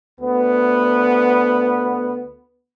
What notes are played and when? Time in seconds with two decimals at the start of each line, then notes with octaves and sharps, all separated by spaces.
0.21 D2 B3